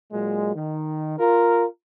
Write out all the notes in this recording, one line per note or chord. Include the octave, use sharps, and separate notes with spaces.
A#2 F#3 G#3
D#3
F4 A#4